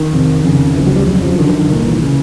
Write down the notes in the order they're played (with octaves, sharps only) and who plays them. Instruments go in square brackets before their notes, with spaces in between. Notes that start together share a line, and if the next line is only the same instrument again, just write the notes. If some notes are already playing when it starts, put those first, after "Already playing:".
Already playing: [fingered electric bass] D#3
F2 C3
F2 C#3
D2 C#3 E3
F#3
G3
F2 C#3 F#3
F3
F#2 D3 D#3
E3
D#3
C2 A#2 D#3
E3
C#3